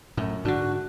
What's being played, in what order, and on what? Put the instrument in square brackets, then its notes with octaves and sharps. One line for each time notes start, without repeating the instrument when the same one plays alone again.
[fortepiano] F#2 [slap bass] A2
[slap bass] G#2 D3 [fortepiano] D4 [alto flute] F#4